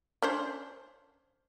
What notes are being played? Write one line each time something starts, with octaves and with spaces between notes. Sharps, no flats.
C#4 D4 C5